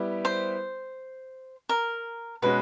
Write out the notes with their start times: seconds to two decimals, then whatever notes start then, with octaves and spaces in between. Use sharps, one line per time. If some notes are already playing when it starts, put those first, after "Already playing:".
Already playing: G3 B3 E4 G4
0.25 C5
1.69 A#4
2.42 B2 G#3 C#4 F#4 B4